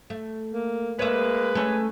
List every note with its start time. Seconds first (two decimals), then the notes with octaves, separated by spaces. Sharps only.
0.10 A3
0.53 A#3
0.99 G#3 A#3 B4 C#5 E5
1.55 A3 C#4